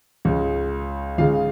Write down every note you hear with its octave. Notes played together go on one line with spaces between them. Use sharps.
C#2 C#3 G#3
C#2 C#3 G#3 F4 F5